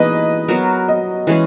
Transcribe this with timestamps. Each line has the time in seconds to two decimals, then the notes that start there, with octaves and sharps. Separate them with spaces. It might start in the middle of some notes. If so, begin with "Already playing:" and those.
Already playing: E3 A#3 D#4 G#4 B4 D#5
0.48 F#3 B3 F#4 A#4
0.88 D#5
1.27 E3 G#3 C#4 G#4